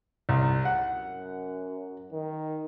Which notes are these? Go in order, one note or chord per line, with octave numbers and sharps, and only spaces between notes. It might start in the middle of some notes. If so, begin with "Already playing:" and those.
C2
F#5
F#2
D#3